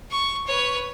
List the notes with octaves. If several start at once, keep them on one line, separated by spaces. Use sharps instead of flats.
C#6
B4 C#5